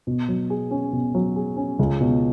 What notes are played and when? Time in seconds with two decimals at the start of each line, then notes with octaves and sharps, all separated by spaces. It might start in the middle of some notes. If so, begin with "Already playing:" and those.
0.07 B2
0.28 F#3
0.50 G#4
0.71 C#4
0.93 B2
1.15 F#3
1.36 G#4
1.57 C#4
1.79 C#2
2.01 B2